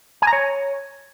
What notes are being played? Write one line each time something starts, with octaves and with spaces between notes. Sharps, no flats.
G#5
A#5
C#5